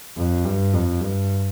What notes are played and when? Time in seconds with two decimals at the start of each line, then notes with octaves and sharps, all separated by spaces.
0.18 F2
0.45 G2
0.74 F2
1.01 G2